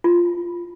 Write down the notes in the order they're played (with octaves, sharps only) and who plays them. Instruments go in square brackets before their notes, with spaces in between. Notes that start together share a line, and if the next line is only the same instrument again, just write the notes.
[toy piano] F4